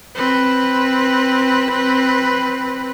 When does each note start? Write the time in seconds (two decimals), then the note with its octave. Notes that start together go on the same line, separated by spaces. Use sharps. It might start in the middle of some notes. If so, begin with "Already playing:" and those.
0.15 C4 B4